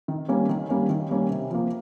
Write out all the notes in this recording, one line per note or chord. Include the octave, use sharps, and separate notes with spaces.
D#3
G3 A#3 C#4
D#3
G3 A#3 C#4
D#3
G3 A#3 C#4
C3
F3 A#3